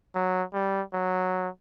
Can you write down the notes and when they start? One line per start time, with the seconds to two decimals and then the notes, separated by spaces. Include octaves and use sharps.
0.15 F#3
0.54 G3
0.93 F#3